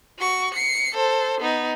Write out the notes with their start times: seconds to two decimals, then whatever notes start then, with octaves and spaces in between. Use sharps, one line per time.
0.19 F#4 C#6
0.54 C7 C#7
0.95 A4 C5
1.41 B3 D#4